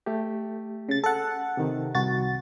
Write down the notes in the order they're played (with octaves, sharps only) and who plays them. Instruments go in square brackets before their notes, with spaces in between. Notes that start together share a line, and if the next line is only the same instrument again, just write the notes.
[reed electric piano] A3 G4
[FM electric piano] C#3 A6
[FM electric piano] A4 F#5 [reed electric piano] A5
[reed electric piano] C3 D#3
[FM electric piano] C2 F#4 A6